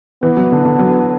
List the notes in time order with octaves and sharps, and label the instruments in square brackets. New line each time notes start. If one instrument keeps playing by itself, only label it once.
[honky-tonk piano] E3 [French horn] B3
[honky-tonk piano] F#3
D3
D3
F#3